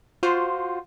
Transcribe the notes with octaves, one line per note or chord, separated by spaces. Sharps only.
F4 F#4 C5